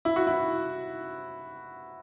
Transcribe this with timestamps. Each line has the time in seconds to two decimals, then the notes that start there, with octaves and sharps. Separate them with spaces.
0.05 E4
0.16 F#4
0.27 E4